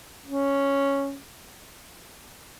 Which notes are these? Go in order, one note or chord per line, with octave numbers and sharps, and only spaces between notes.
C#4